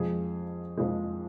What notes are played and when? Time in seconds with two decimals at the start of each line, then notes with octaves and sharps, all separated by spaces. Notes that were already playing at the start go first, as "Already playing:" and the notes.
Already playing: F2 F3 G#3 G#4
0.77 F2 F3 G#3